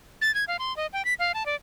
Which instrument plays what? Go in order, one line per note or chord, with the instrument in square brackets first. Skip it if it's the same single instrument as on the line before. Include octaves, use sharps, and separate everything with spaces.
[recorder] A6
G#6
F5
C6
D#5
G5
B6
F5
A5
D5